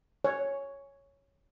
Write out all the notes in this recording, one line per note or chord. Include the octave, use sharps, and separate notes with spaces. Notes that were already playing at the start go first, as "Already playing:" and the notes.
C#5